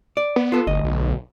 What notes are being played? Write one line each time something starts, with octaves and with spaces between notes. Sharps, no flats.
D5
B3
F4 A4
G1 D2 D#5
B1